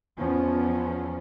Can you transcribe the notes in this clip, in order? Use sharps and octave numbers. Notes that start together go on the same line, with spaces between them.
E2 F3 B3 C#4